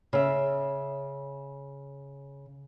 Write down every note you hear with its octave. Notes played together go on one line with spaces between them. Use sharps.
C#3 E5